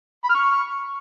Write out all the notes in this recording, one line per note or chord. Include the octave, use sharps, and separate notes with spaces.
B5
F6
C#6